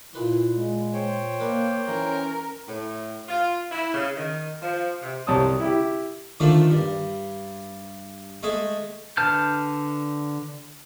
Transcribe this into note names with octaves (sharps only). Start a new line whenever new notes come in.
A#2 E4 B4 C6
G#3
C5 C#5 G5
A#3 A#4 B4 D5
E3 C#4 A#4
A2
F4
E4
C#3
D#3
F3
C3
C2 C#5 A5 D#6
E4 G4
D3 D#3 F3 A3 D4
G2
G#3 A3 G#4 A4
D3 B4 A5 F6 G6